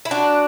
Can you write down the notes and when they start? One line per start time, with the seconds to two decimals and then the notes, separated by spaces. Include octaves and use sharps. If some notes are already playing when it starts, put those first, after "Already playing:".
0.05 E4
0.11 D4 F#4